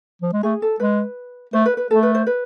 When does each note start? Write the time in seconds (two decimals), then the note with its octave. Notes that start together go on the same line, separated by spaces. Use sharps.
0.22 F3
0.33 G#3
0.43 A3 G#4
0.62 A4
0.80 G#3 B4
1.53 A3 C5
1.66 B4
1.77 B4
1.91 A3 A4
2.03 B4
2.15 C5
2.27 B4